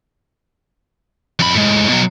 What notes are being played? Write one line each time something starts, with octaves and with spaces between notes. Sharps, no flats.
F2 B5
A2 G#3
B2 F#3